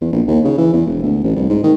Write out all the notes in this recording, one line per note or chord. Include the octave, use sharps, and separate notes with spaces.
E2
A#1
D#2
C#3
E3
E2
E1
D2
A1
C2
G#2
D#3